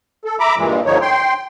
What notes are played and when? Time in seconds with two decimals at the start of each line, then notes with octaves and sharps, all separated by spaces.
0.25 A4
0.40 E5 A#5 B5 D6
0.58 G2 A#2 E3 G#3
0.86 G2 D3 F3 D#4 C#5
1.02 G5 C6